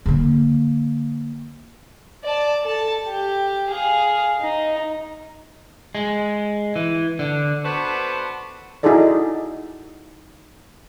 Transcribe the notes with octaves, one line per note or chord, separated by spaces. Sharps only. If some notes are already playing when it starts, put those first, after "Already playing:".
D3 A#3
D5 A5
A4 A5
G4
G#4 F5
D#4
G#3
E3
D3
B3 D4 F#4 A4 B4 C5
D#4 E4 F#4 G#4 A4 D5